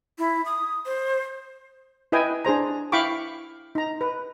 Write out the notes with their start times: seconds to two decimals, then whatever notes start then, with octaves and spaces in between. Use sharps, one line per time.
0.19 E4
0.46 D#6
0.86 C5
2.12 E4 B4 D#5 G5 G#5
2.45 D4 G#4 C5 A#5
2.92 E4 F5 G5 B5 C#6 D6
3.75 D#4 A#5
4.01 B4